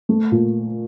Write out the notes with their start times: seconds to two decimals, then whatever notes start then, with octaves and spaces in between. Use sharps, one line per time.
0.09 A3
0.32 A#2